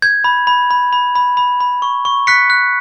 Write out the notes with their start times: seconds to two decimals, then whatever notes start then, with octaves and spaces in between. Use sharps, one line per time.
0.02 G6 G#6
0.24 B5
0.47 B5
0.71 B5
0.93 B5
1.15 B5
1.37 B5
1.61 B5
1.82 C#6
2.05 C#6
2.27 F#6 B6 C#7
2.50 F#6